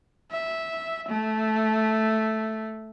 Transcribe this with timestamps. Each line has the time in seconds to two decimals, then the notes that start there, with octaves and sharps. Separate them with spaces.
0.31 E5
1.08 A3